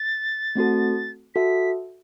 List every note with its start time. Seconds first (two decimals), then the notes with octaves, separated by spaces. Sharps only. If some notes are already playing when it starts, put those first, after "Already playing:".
Already playing: A6
0.55 A3 C4 F#4 A4
1.34 F#4 A4 E5 B6